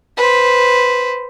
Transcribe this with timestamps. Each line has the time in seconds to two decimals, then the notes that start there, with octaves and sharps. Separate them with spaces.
0.17 B4 C5